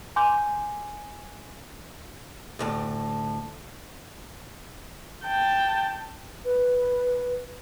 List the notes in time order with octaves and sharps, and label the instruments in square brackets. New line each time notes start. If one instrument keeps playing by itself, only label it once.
[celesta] G#5 C6 D6 G6
[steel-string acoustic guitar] D2 A2 A5
[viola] G5 A5
[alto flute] B4